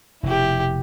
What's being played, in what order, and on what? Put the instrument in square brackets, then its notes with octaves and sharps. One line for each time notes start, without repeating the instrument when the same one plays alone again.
[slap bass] F1 B2 [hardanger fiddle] E4 G4